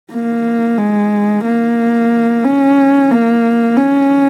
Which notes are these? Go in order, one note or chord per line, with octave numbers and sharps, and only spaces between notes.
A#3
G#3
A#3
C#4
A#3
C#4